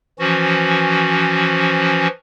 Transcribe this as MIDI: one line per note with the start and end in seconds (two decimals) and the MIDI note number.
0.19 2.07 52
0.19 2.07 53
0.19 2.07 61
0.19 2.07 66